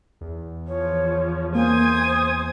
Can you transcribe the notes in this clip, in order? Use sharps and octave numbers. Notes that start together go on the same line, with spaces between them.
E2
E3 F3 C#5
A#3 C5 G#5 D#6